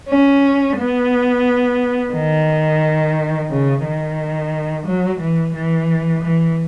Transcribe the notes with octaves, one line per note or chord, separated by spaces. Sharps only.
C#4
B3
D#3
C#3
D#3
F#3
E3
E3
E3